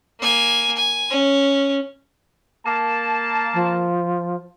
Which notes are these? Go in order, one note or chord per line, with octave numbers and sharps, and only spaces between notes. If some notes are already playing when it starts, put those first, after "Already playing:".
A#3 G#5
G#5
C#4
A#3 A5
F3